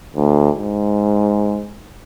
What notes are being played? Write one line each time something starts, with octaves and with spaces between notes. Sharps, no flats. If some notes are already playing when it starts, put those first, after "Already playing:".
D2
G#2